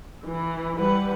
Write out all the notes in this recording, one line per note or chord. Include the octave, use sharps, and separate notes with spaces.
E3
E3 G3 B4 F#5